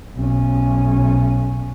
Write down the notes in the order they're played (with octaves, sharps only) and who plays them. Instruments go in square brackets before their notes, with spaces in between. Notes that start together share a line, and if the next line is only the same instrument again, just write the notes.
[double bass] B1 C#4